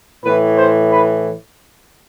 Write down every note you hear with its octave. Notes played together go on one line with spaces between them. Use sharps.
A2 E3 B4
C5
B4